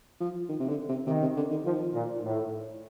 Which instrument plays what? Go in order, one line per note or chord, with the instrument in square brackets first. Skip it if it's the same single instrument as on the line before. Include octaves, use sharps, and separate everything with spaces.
[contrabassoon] F3
D#3
C3
D3
C3
[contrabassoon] C3 [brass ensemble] D#3
[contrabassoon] C3
D3
D#3
[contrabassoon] D#3 [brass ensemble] F3
[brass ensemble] A#2
A2